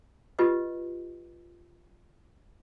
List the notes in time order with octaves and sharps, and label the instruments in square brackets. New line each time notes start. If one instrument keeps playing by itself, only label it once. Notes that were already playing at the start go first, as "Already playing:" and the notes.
[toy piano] F4 G4 B4 D#5